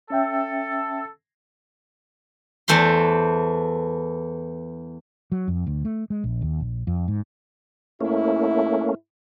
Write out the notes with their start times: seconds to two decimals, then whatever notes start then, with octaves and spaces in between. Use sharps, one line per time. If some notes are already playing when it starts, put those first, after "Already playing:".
0.10 C#4 A4 E5 G5
2.68 E2 E3 A3 C5 C6
5.32 F#3
5.48 F2
5.67 D2
5.85 A3
6.10 G#3
6.24 A#1
6.42 D#2
6.61 A#1
6.87 F2
7.08 G#2
8.01 G#2 A3 A#3 C#4 E4